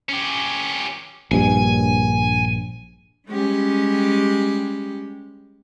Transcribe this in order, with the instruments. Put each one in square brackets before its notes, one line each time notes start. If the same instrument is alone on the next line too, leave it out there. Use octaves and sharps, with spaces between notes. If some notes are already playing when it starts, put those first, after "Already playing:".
[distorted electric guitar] C#4 G4
[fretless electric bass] A#1 G2 [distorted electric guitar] G#5
[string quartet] G3 G#3 C#4 G4